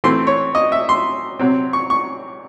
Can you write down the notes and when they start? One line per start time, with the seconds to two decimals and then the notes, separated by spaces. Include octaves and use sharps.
0.04 E3 A3 C4 C6
0.27 C#5
0.55 D#5
0.72 E5
0.89 C6
1.39 C3 F#3 C4
1.73 C#6
1.90 C#6